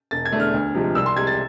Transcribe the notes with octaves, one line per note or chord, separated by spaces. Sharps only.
E1 A6
G#6
E2 D3 A3
F6
D2
C3 F3 G#3
C2 E6
C6
C3 G#3 G#6
A6